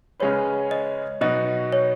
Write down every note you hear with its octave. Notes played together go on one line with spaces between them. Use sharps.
C#3 G#3 C#4 G#4 B4 C#5
D#5
B2 F#3 B3 D#4 F#4 D#5
C#5